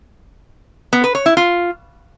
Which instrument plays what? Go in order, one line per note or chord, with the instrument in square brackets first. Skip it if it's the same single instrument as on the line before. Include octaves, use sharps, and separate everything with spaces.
[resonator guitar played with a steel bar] B3
B4
C#5
E4
F4